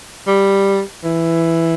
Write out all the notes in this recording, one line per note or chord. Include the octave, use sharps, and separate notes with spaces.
G3
E3